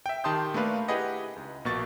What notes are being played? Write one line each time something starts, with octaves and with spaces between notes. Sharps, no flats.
E5 G5
D#3 G4 A5 C6 D#6 G6
A3 A#3 D4 B4 F5
E4 G4 G#4 B4 D#5 F#5
C#2
A#1 B2 A#3 C#6 A6